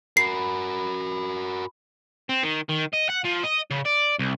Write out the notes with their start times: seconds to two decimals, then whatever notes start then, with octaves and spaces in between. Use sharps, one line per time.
0.17 F#4 A#4 B5 C7
2.29 C4
2.43 D#3
2.69 D#3
2.93 D#5
3.09 F#5
3.24 F3
3.43 D#5
3.71 C#3
3.86 D5
4.19 C2